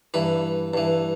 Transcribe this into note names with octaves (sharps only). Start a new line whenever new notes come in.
G2 E3 B5
G2 E3